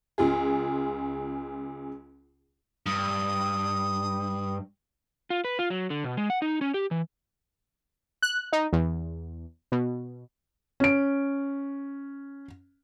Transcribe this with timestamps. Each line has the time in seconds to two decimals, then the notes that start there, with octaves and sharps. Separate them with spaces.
0.18 C#2 F4 G#4
2.86 G2 D#6
5.30 F4
5.44 B4
5.59 F4
5.70 F#3
5.90 D3
6.04 B2
6.17 G#3
6.30 F#5
6.42 D#4
6.61 C#4
6.74 G4
6.91 E3
8.22 F#6
8.52 D#4
8.73 E2
9.72 B2
10.80 C#4 D7